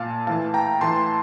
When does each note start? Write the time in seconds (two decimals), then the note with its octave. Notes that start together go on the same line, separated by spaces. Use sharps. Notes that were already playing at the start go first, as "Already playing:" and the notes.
Already playing: A#2 F5 A5
0.27 A2 E3 F5 A5
0.54 G5 A#5
0.81 A2 E3 A5 C6